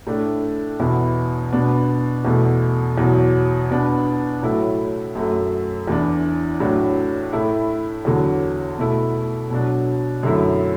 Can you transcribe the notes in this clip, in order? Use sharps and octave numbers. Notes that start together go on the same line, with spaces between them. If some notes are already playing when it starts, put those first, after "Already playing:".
A2 A3 D4
E2 B2 B3 E4
B2 B3 D4
E2 B2 A3
E2 B2 F#3
B2 B3 D4
A2 F#3 A3 E4
F#2 F#3 A3
E2 E3 D4
A2 F#3 D4
A2 A3 E4
E2 D3 F#3
B2 A3 E4
B2 F#3 D4
F#2 D3 F#3 A3 E4